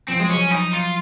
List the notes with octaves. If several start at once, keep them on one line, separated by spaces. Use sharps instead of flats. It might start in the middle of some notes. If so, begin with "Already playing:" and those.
F3 C4
F#3 G#3
F#3 C#4
D#4
F4